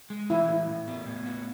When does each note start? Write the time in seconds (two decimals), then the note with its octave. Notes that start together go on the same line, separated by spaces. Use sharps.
0.10 G#3
0.30 E3 E4
0.49 A2
0.69 A2
0.88 B3
1.07 A2
1.26 B3